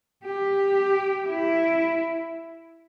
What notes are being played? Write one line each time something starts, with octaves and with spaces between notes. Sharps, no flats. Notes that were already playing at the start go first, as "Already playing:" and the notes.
G4
E4